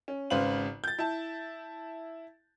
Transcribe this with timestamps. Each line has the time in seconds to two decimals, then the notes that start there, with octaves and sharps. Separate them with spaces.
0.08 C#4
0.30 G#1 C#3 B4 C5 F5 F#7
0.84 G6 A6
0.99 E4 A5